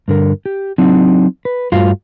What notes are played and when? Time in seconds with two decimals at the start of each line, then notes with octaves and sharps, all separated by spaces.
0.08 G2 D3 A#4
0.46 G4
0.78 F#3 C4 D4 D#4
1.45 B4
1.72 G2 A3 F4 F#4 F5